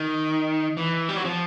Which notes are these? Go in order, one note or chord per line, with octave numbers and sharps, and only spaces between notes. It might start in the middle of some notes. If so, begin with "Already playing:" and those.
Already playing: D#3
E3
G3
F#3
F3